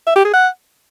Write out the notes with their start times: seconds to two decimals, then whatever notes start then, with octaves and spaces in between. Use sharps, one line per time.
0.07 E5
0.16 G4
0.25 G#4
0.34 F#5